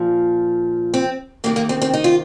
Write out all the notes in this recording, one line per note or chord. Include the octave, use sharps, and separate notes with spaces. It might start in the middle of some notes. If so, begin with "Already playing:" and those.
Already playing: A#2 F3
C4
C3 D#3 A#3
A#3
C4
C4
D#4
F4